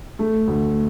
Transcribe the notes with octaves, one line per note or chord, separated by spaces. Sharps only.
A3
D2